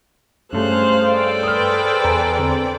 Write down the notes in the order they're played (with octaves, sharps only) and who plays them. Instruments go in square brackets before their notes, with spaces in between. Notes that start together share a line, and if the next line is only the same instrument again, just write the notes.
[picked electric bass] G2 [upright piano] G3 A3 C#4 [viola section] G#4 C5 F5 [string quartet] F#6
[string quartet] A4 D5 G5
[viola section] G#4 B4 C5 [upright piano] D#6 F6
[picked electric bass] E2 [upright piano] G#5 A#5
[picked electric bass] D3 C4